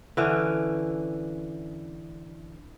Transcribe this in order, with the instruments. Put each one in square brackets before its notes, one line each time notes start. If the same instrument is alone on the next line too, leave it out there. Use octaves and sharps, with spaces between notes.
[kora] D3 E3 C#4